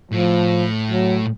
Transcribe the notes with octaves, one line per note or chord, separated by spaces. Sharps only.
A2 F3
F#3